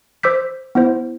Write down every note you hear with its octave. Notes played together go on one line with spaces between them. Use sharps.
C5 D6 E6 G6 B6
B3 E4 C5